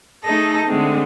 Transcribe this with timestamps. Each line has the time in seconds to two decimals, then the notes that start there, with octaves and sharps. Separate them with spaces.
0.23 A3 D#4 G#4 A4 A#6
0.67 D3 G#3 A3 C4